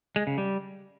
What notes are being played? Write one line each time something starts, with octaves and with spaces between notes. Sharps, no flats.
G#3
C#3
G3